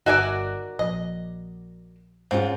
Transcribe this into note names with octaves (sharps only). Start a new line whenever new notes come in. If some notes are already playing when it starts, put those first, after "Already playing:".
G1 D#4 F#4 A#4 D5 E5 G#5
A#1 D#5
G#2 C4 C#4 F4